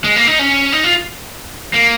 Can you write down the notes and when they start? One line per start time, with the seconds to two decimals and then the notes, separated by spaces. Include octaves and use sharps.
0.04 G#3
0.16 A#3
0.27 D#4
0.39 C#4
0.72 D#4
0.84 F4
1.74 A#3